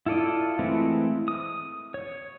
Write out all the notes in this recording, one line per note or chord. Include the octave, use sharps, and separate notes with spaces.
E4 F4 A4 D5 D#5
E3 G#3 A3 C4 E4
D#6
C#5